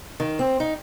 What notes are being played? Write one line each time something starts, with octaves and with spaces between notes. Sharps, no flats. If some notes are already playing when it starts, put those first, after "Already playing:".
D#3
C4
D#4